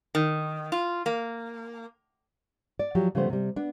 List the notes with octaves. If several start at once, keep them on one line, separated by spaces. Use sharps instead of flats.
D#3
F4
A#3
D5
F3 F#3 G4
C#3 F3 G3 A3 B3 C5
C3 G3
B3 D4